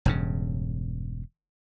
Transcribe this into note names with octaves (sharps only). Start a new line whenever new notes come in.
E1 G2 C#3